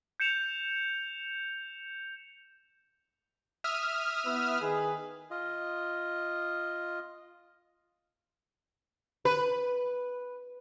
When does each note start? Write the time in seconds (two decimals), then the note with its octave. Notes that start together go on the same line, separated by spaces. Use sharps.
0.20 G6 C#7 E7 F7
3.64 E5 D#6 F6
4.26 B3 E4 B4
4.61 D#3 G#4 B4
5.31 F4 D#5
9.25 B4